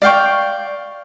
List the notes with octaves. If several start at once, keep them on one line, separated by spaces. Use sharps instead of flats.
D5 F5 G5 C#6